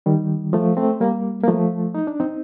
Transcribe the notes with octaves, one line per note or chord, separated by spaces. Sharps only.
D#3 G3
F3 A3
A3 C4
G3 A#3
A#3
F3 A3
D#4
D4
C4 D#4